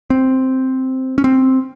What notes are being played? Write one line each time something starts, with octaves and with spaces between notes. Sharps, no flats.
C4
C#4
C4